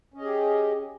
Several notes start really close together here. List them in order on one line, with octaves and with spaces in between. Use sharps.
C#4 D#5 G#4 G4